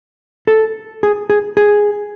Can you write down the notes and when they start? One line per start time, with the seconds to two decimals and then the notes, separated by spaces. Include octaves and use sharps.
0.47 A4
1.03 G#4
1.30 G#4
1.57 G#4